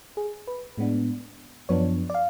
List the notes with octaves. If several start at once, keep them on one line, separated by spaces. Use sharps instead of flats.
G#4
B4
A2 G#3 B3 D4
F#2 F3 B3 D4 C#5
D5
F5